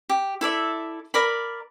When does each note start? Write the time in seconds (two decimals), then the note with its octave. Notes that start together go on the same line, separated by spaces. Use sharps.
0.09 G4
0.41 E4 A4 D5 E5
1.14 A#4 D5 B5